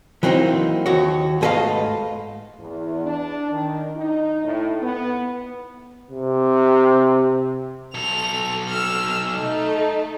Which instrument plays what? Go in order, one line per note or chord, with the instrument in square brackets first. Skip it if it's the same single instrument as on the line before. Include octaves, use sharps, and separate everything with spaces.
[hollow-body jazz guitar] E3 F#3 A#3 C4 D4 D#4
D#2 F#4 C#5
G#2 A3 G#4 B4 D#5 F5
[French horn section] E2
D4
D#3
D#4
A2
B3
[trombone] C3
[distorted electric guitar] B1 A4 [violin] F7
[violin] E6 F6
A3 D#4